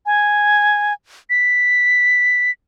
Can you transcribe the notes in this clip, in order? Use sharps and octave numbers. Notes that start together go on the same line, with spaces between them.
G#5
B6